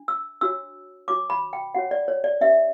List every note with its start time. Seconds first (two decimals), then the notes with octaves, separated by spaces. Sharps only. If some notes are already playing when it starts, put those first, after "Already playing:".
Already playing: D4
0.08 E6
0.41 D4 F#4 C#5 E6
1.08 D4 F#4 C#5 D6
1.30 B5
1.53 G5
1.75 D4 F#4 C#5 F#5
1.91 D5
2.08 C#5
2.24 D5
2.41 C#4 G4 B4 E5